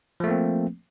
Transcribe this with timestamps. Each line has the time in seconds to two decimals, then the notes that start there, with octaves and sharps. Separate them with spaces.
0.20 F3
0.24 A3
0.27 A#3
0.31 C4